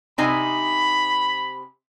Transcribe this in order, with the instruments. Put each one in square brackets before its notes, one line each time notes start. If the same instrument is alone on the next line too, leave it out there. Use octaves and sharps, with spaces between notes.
[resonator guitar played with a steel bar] C3 D#4 G#5 [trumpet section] B5